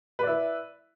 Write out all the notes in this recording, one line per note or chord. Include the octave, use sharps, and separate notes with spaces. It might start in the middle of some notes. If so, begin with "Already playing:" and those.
E4 B4 D5